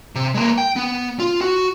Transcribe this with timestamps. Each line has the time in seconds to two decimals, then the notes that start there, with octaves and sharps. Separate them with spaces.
0.15 C3
0.34 G#3 A#3
0.58 G5
0.76 B3
1.19 F4
1.41 F#4